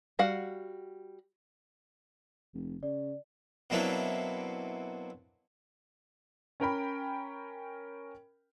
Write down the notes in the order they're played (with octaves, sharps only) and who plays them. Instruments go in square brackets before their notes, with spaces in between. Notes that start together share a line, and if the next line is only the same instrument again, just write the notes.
[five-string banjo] G3 F#4 F5 F#5
[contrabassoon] F1
[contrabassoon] C#3 [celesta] D5
[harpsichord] B2 F#3 A#3 C4 D4 E4
[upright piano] C#4 A#4 G5 B5